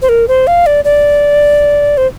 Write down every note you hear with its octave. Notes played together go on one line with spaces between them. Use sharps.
C5
A#4
C5
F5
D5
D5
C5